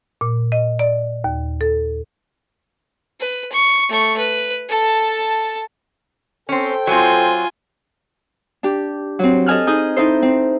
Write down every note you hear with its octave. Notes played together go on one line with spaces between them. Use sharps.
A#2
D#5
D5
D#2
A4
B4
C#6
A3 C#6
B4
A4 A5
C4 C#4 A4 C5 G5
F#3 C4 F4 G#5
D4 G4
F#3 C4
A4 D#5 G#5 F6 F#6
D#4 G#4 D#6 G6
D#4 E4 A4 C5
C4